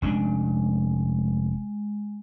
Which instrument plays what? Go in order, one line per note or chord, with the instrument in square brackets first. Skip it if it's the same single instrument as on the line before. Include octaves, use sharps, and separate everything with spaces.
[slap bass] F1 C#4 D4 [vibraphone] G#3